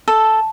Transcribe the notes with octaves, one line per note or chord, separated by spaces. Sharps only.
A4